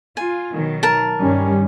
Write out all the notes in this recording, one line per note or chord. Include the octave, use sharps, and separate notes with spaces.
F4 G#5
B2 D#3 F#3
A#4 A5
G2 D#3 G3 C#4